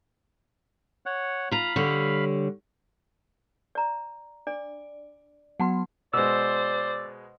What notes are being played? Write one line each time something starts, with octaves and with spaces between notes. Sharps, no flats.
C#5 F#5
F4 F5 A#5 B5
D3 G3 C#5
D5 A#5
D4 D5
F#3 B3 F#5 A5 B5 C6
B2 G#3 C5 D5 E6